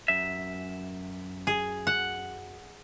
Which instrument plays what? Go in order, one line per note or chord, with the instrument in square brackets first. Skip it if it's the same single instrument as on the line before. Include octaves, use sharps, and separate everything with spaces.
[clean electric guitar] F#2 E5
[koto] G#4
F#5